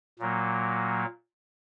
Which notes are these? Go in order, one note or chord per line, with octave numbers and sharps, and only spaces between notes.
A#2 F#3 A#3